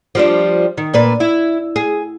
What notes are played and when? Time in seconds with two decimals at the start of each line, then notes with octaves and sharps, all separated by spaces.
0.15 F3 G3 D4
0.77 D#3
0.93 A#2 D4 B4
1.20 E4
1.76 G#4